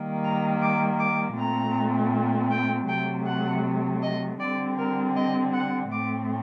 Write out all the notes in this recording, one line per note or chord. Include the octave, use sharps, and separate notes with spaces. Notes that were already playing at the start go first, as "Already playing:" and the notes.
Already playing: D#3 G3 A#3
A#5
D6
D6
A#2 A3 C4 A#5
G5
C3 F#3 A3 G5
F#5
D#5
D3 G3 C4 D5
A#4
D#5
F#5
A2 A3 C4 D6